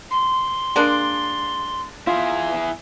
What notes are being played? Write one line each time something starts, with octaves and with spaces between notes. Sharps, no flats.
C6
G#3 A#3 D4
E4 F4 G#4